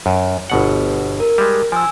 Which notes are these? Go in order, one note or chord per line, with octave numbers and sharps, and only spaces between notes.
F#2
G1 B2 F#5
A#4
G3 G#3
F3 G#5 E6